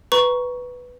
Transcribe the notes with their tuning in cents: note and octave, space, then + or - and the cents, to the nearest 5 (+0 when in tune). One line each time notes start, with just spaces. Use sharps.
B4 +0 A#5 +20 C#6 +5